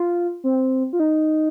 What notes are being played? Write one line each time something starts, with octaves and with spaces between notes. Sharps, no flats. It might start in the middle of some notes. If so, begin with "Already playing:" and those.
Already playing: F4
C4
F4
D#4